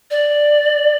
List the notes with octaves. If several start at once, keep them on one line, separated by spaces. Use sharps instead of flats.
D5